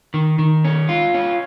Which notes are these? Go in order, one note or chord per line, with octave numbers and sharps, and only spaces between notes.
D#3
D#3
C#4
F4
C#4